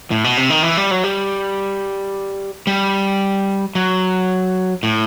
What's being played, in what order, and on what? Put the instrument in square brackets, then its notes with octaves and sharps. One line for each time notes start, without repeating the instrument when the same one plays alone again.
[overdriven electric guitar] A2
B2
C3
D#3
E3
G3
F#3
G3
G3
F#3
A2